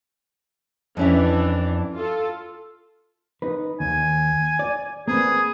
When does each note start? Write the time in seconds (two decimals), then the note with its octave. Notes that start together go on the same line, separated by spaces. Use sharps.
0.97 F2 E3 C#4 D4 E5
1.94 F4 A4
3.42 D#4 B4
3.80 D#2 G#5
4.59 D5
5.08 A#3 C4 G#4 B4